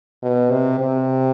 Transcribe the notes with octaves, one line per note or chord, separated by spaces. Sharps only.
B2
C3
C3